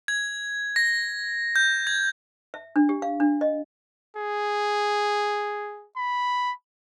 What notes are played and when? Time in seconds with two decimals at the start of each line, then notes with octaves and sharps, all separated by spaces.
0.08 G#6
0.76 A#6
1.56 G6
1.87 G#6
2.54 E5
2.76 D4
2.89 G4
3.02 F5
3.20 D4
3.41 D#5
4.17 G#4
5.97 B5